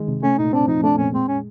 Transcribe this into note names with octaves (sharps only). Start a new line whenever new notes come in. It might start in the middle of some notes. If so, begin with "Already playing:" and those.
Already playing: D#3 G#3
C3
A3 C#4
A#2 D#4
C4 D4
F3 D#4
A3 D4
A#2 C#4
G#3 C4
C#4